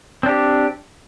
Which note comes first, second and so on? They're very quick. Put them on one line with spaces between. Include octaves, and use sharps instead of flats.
C4 D4 G4